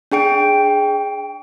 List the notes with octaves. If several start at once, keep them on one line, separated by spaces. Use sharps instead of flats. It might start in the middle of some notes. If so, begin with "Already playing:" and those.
D4 G#4 G5 D7